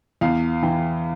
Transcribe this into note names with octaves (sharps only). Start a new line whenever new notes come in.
E2 F5
E3 G5